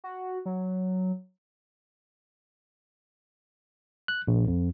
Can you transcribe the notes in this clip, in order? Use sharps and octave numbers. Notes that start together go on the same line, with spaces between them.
F#4
F#3
F#6
A#1
F2